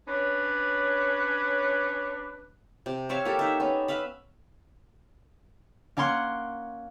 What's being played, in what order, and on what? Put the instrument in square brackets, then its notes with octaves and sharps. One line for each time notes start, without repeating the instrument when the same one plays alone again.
[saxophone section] C#4 D4 B4 C#5
[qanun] C3
C4 C#5 E5 F5
A#3 G4 A4
D#4 E5
B3 C#4
B4 E5 F5 B5
[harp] A#3 C#4 F#5 C6 C#7